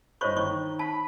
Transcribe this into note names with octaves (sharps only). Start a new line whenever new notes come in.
G1 C5 C#5 D#5 B5 C#6
D#3 A#5 C#6
A5 B5